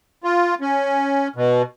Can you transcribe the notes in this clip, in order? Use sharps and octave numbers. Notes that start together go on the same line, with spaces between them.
F4
C#4
B2